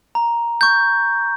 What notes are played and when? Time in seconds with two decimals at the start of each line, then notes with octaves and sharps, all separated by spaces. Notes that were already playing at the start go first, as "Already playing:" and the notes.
0.15 A#5
0.61 C#6 G6